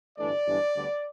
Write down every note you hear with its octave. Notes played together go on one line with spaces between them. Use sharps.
G1 G2 E3 A3 D4 D5
G1 G2 E3 G3 D4
D2 D3 G3 B3